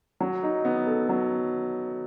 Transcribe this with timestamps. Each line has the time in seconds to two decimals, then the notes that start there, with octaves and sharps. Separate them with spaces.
0.20 F#3
0.43 D#4
0.65 B3
0.87 A4
1.09 F#3